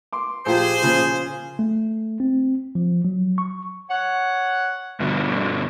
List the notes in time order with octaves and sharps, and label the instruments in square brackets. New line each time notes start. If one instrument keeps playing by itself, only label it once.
[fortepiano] C6 D6
[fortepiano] A#1 F4 G4 [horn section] G#4 C5
[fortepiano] A#2 C#3 F3
[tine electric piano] A3
C4
F3
F#3
C#6
[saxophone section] C#5 F#5
[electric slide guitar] G2 B2 D3